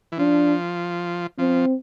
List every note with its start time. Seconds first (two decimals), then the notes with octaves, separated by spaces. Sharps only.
0.12 E3
0.18 F3 D4
1.38 F3 C4